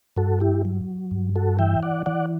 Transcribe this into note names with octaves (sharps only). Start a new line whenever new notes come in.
G2 F#4 A4
E4 G4
F#3
G2
F#4 A4
E3 E5 G5
D5 F#5
E3 D5 F#5